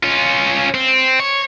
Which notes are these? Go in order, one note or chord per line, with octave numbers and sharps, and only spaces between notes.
C#4 F4
C4
C#5